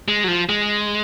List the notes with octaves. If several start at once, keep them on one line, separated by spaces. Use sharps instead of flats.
G#3
F#3
F3
G#3